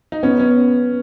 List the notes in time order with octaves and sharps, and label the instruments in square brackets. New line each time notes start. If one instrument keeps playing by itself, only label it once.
[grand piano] D#4
[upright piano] B3 [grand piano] C#4
[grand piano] C#4